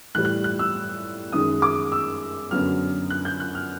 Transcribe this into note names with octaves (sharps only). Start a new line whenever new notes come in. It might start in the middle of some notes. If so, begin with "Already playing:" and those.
A2 E3 G3 F#6
F#6
F#6
E6
F#2 D#3 G#3 D#6
D6
E6
F#2 D3 F#3 B3 F6
F#6
G6
F#6
F6